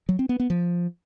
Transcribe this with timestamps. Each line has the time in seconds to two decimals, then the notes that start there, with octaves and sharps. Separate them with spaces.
0.09 F#3
0.19 C4
0.29 B3
0.40 B3
0.50 F3